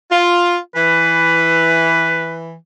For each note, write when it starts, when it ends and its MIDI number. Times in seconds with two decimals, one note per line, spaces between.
0.11 0.57 65
0.76 2.55 52
0.76 2.39 71